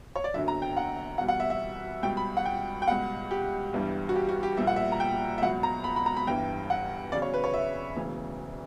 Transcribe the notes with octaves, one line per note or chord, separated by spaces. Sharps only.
C#5
D5
F#1 F#2 D3 F#3 E5
A#5
G5
F#5
E2 B2 G3 F#5
F#5
E5
E5
C#2 B2 G3 G5
B5
F#5
G5
G5
C#2 B2 G3 F#5
G4
G1 G2 E3 G3
F#4
G4
F#4
G4
A#1 A#2 G3 E5
F#5
E5
A#5
G5
E5
C#2 B2 F#3 F#5
A#5
B5
B5
A#5
B5
G1 G2 E3 G5
F#5
E2 C#3 F#3 D5
C#5
B4
C#5
E5
E1 D2 C#3 E3